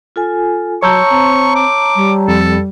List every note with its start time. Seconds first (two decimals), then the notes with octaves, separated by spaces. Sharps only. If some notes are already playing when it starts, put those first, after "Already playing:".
0.16 F4 A4 G#5
0.82 F#3 C#5 A5 A#5 C6 C#6 E6 G6
1.10 C4
1.56 D6
1.96 G3
2.28 F2 A4